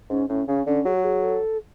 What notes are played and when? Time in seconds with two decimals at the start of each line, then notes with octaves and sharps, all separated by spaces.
0.10 G#2 C#4
0.29 A2 C#4
0.48 C#3 C#4
0.66 D3 C#4
0.85 F#3 G#4
0.95 F#4
1.04 G#4
1.23 A4